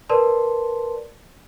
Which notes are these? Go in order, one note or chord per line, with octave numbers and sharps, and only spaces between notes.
A#4 B4 D5 A5 C6